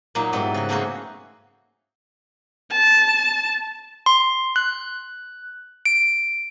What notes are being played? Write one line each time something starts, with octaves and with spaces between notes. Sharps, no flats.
A#2 F#3 A#3 D#4
G#2 F#3 G3 B3 C4 E4
C#3 F#4
A3 A#3 C4 C#4 F#4 G#4
A5
C6
F#6
D7